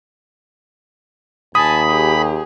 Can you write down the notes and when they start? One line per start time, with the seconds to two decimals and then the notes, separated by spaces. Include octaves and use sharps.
1.55 D#2 G#5 A5 B5 D#6
1.89 G4 G#4